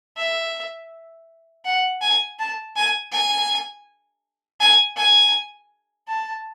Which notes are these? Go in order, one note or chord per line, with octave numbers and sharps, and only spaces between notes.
E5
F#5
G#5
A5
G#5
G#5
G#5
G#5
A5